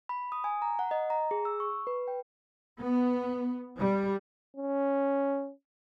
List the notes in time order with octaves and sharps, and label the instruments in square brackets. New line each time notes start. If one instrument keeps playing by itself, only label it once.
[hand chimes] B5
D#6
G#5
A#5
F#5
D#5
A#5
G#4
E6
C#6
B4
G5
[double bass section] B3
G3
[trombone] C#4